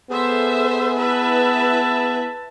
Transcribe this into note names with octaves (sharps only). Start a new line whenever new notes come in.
B3 G#4 A4 C5 E5
E4 B4 E5 A5